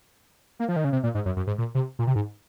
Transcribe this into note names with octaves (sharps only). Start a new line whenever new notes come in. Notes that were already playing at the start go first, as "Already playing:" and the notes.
A#3
F3
D#3
C#3
C3
A#2
G#2
F#2
F#2
G#2
A#2
C3
A#2
C3
G#2